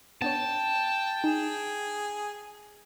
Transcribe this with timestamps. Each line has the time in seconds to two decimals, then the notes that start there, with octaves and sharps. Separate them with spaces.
0.22 B3 D4 C#5 G5 A5
1.24 D#4 G#4